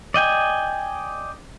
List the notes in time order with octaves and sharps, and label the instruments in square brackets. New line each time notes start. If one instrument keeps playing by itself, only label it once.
[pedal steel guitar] D5 D#5 G5 G#5